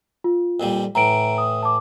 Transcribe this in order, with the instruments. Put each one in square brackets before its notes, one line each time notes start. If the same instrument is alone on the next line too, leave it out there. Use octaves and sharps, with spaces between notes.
[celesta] F4
[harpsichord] F2 A#2 G3
[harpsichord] A2 E3 [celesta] A#5 D7
[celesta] D#6
A5 D6